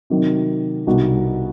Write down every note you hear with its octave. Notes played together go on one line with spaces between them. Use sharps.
C3 D#3 F#3
C2 B2 G3 D#4 F#4